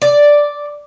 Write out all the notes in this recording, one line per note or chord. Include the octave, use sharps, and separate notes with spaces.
D5